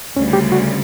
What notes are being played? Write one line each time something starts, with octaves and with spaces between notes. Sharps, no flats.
D2 C#3 G3 C#4
G4
F#4